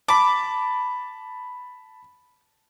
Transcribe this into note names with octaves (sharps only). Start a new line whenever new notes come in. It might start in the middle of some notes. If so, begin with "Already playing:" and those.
A5 B5 D6